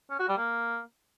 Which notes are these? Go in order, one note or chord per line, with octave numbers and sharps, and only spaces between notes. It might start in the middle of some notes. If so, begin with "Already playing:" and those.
C#4
F#4
G3
A#3